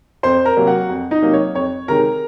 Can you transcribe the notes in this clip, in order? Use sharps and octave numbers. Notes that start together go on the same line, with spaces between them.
F2 C5 C6
A#4 A#5
C3 F#3 A#3
F#4 F#5
F2
D#4 D#5
C3 F#3 A#3
C#5
F2 C#5
C3 D#3 G#3 A#4 A#5